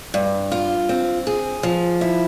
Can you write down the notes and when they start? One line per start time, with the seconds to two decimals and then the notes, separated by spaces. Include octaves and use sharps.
0.14 G2
0.52 F4
0.89 C4
1.27 G#4
1.63 F3
2.01 E4